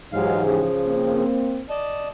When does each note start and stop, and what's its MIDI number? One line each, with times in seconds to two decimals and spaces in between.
0.13 0.64 44
0.13 0.64 52
0.13 0.42 54
0.13 0.42 56
0.13 0.64 67
0.13 0.42 77
0.43 1.23 49
0.43 1.23 53
0.87 1.62 58
0.87 1.62 60
1.70 2.08 74
1.70 2.08 75
1.70 2.08 81